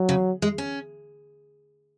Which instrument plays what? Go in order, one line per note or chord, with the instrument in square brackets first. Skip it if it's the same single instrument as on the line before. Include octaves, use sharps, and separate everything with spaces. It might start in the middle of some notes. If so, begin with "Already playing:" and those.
Already playing: [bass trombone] F#3
[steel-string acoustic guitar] C#3
G#3
C#4